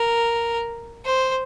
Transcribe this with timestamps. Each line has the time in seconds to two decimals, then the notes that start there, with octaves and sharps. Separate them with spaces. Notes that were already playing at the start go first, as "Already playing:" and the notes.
Already playing: A#4
1.05 C5